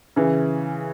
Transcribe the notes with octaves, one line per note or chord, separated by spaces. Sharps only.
C#3 E3